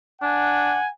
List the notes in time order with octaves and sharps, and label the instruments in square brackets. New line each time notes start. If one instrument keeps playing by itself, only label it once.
[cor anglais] D4 [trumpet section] F#5 G#5